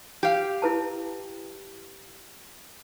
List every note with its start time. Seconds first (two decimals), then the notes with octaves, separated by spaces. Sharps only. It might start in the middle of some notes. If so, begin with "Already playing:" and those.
0.23 G4 F5
0.62 E4 B4 A5